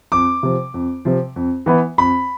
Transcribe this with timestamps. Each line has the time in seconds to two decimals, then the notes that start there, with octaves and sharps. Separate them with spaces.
0.12 F2 D6
0.43 C3 F3
0.74 F2
1.05 C3 F3
1.36 F2
1.66 E3 B3 E4
1.98 F2 B5